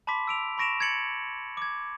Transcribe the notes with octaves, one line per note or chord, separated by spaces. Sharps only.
A5 B5 C6 D6 B6
E6 D7 F7
B5 C#6 A#6 D7 E7 F7
G#6 A6 C#7 F#7
D6 G#6